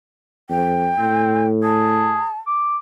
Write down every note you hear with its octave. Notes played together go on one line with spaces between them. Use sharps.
F2 G5
A2 C4
G#4 A5
D6